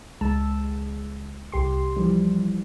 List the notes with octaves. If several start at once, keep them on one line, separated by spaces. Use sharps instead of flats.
C#2 G#3 A5 E6
C2 G4 C6
E3 F3 G3